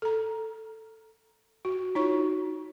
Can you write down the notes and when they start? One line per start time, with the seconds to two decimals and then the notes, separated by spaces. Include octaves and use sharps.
0.02 A4 A#5
1.65 F#4
1.95 D#4 F4 F#4 C#5 C#6